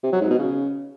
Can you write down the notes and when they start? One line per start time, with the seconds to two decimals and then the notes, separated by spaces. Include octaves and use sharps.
0.03 C3
0.12 F#3
0.21 G#2
0.30 B2
0.39 C#3